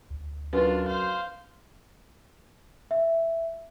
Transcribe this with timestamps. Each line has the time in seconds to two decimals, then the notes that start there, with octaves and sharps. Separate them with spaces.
0.10 D2
0.53 F#2 D4 F4 B4
0.87 C5 F5
2.91 E5